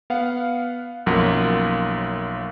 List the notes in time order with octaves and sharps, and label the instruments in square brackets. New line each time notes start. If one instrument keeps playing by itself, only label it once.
[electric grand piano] B3 F5 F#5
B1 F#2 F3 A#3 F#5